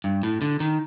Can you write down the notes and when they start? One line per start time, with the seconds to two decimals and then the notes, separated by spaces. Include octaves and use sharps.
0.04 G2
0.23 A2
0.42 D3
0.60 D#3